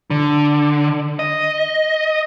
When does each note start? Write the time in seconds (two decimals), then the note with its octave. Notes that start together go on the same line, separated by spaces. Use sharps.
0.10 D3
1.19 D#5